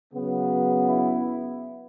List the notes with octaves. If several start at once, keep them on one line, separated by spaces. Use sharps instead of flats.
C#3 F#3 B3
E4